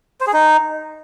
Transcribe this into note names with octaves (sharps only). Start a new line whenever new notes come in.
C5
G#4
D#4